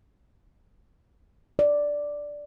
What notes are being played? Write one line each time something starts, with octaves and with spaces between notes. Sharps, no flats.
D5